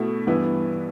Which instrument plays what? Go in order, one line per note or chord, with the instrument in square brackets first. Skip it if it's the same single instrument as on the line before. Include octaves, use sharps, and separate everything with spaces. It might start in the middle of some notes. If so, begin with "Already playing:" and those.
Already playing: [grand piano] B2 A3 E4
G2 E3 B3 E4